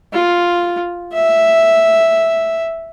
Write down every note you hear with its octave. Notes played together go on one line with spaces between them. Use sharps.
F4
E5